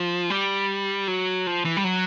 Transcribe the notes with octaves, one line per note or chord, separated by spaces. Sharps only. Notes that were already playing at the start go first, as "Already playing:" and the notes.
Already playing: F3
G3
F#3
F3
E3
G3
F#3